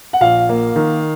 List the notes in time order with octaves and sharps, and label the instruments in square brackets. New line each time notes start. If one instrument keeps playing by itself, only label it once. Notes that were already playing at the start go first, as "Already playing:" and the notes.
[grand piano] F#5
[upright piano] A#1 [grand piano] F5
[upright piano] A#3
D#3